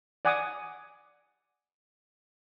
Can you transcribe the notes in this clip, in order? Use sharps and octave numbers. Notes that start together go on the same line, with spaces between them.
D5 F#5 G#5 D6 D#6